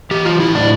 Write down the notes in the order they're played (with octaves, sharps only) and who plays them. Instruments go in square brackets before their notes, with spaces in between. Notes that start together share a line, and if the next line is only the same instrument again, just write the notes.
[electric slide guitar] E3 G4
F4
A2 E4
D4